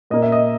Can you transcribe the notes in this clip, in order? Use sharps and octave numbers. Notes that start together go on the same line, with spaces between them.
A#2 A#3 D#5
E5
D#5